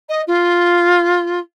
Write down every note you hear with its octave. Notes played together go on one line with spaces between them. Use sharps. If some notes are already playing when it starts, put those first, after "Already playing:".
D#5
F4